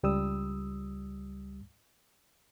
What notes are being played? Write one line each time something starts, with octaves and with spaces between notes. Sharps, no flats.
C#2 G3 D#6 E6